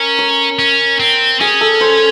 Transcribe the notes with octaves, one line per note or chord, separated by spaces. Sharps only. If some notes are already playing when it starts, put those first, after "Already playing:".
Already playing: C#4 A#4
C#5
C#4
C4
C#4 G#4
A4
C5